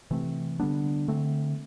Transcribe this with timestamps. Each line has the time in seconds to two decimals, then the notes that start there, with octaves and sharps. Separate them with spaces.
0.11 C3 E3 A3 C4
0.60 D3 G3 B3 D4
1.08 D3 A3 C4